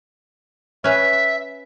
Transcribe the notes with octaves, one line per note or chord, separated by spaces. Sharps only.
C#4 B4 E5